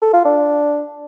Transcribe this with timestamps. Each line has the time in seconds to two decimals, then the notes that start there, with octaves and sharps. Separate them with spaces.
0.02 A4
0.13 F4
0.25 D4